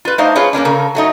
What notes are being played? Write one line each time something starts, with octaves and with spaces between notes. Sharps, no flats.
F4 B4
A3 D4 D#4 C5 F5
F4 G#4 B4 C#5
G2 A#3 C#4 D4
C#3 A4 A#4
F#3 A3 D#4